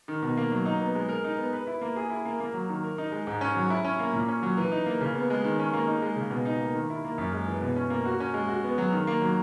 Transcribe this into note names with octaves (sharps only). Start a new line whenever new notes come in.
D#3
B2
A#3
F#3
D#4
B3
G#3
A#4
D#4
B3
B4
E4
A#3
G#4
E4
A#3
A#3
F#3
D#3
A#4
D#4
G#3
G#2
C#4
F#3
E4
C#4
A#3
A#2
C#4
F#3
E3
D#4
A#3
C#3
B3
G#3
D#3
C#4
A#3
D#4
G#3
C#3
B2
D#4
A#3
D#3
E4
A#3
F#2
G#3
E3
B2
C#4
A#3
F#4
C#4
G#3
F#4
B3
F#3
D#3
A#3
F#3